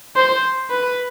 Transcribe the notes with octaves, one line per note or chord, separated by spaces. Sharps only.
C5
B4